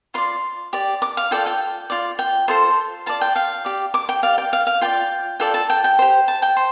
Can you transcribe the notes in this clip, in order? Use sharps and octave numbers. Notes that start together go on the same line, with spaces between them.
F4 D5 C6
G4 D5
D6
F5
F4 A4 D5 G5
G5
F4 D5
G5
F4 A4 C5 C6
F4 D5 A5
G5
F5
G4 D5
D6
G5
G4 D5 F5
G5
F5
F5
F4 D5 G5
F4 A4 D5 G5
A5
G5
G5
G4 C5
A5
G5
C5